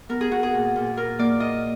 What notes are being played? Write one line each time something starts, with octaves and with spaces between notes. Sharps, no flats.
B3 A#4
G#4
B3 F#4
G#4
A#2
A#2
F4 A#4
A#3 D5
F4 D#5